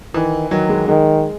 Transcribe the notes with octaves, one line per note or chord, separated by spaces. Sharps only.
D#3 E3
D#3 F#3
G#3
D#3 G#3